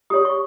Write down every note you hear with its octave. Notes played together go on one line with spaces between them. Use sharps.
G4 C#5 D#6
C#6